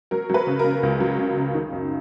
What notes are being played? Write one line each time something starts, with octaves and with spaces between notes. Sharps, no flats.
F#3 A#4
F#3 B4
C#3
A#4
C#3
C#2
F#3
C#3
C#3
D#3
F#2